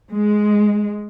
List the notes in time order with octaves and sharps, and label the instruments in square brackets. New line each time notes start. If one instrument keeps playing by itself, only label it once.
[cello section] G#3